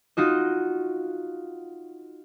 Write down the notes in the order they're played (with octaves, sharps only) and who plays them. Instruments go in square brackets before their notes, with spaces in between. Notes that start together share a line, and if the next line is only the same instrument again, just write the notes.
[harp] D#4 F4 F#4 D#5